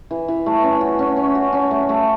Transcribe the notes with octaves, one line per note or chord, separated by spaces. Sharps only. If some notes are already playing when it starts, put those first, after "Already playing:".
E3
E3
A3
C#4
F#4
C#4
C#4
F#4
C#4
A3
A3